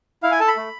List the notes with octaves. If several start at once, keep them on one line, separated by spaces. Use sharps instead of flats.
E4 F5
G#5
A4 A5
B5
A3